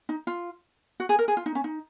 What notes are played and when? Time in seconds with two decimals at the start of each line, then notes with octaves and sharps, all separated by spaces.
0.09 D#4
0.27 F4
1.00 F#4
1.09 G#4
1.19 A#4
1.28 G#4
1.37 F4
1.46 D#4
1.55 C#4
1.64 D#4